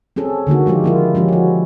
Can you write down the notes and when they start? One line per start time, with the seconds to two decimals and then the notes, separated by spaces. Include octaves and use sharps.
0.16 C4 C#4 G#4 A4
0.47 D3 D#3 A#3 F#4
0.66 F3 G#3 F4 G4
0.84 A#3 E4 F4
1.15 F3 G#3 C#4 G4
1.28 E4 F#4